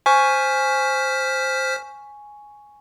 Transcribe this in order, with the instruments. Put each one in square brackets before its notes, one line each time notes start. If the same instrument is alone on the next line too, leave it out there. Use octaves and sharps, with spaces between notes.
[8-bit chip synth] C5 F6 B6 [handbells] G#5 C#6